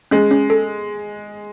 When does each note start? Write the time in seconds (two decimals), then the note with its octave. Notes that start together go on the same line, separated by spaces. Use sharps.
0.11 G#3 C#4
0.31 C#4
0.50 A4